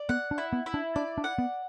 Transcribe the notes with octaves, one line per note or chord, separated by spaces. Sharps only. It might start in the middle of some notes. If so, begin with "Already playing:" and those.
Already playing: D5
B3 F#5
D4
E4
B3
E4
D4
D4 D5
D4
F#5
B3